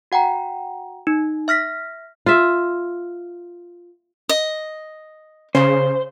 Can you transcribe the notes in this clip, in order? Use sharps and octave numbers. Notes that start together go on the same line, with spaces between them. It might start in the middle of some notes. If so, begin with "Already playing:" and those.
F#4 F#5 G5 A#5
D#4
E5 F6 A#6 B6
F4 E5
D#5
C#3 C5